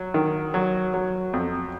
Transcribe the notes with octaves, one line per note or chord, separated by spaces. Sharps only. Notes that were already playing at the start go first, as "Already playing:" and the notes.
Already playing: F#3
D#3
F#3
F#3
F2